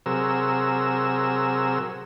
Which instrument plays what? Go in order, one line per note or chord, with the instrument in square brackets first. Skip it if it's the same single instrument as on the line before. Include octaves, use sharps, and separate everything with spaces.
[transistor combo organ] C3 F#3 G#4 A#4 E6